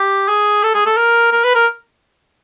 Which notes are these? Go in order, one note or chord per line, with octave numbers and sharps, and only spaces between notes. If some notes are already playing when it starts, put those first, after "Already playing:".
Already playing: G4
G#4
A4
G#4
A4
A#4
A#4
B4
A#4